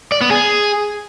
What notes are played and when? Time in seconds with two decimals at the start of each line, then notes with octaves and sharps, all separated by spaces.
0.12 D5
0.21 B3
0.31 G#4